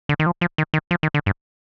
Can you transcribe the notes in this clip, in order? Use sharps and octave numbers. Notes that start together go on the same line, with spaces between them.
D3
D#3
F3
F3
D#3
D#3
F3
D#3
D3
G2